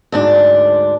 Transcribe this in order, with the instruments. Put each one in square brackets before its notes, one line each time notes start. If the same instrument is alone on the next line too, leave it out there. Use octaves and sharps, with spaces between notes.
[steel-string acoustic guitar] D2 G#2 D4